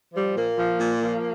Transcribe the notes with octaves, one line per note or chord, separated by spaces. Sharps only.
F3 G3
A#2 A#3
F3
A#2
F3